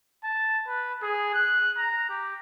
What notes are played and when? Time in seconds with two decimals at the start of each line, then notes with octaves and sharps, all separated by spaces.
0.24 A5
0.67 B4
1.02 G#4
1.34 F#6
1.77 A#5
2.09 G4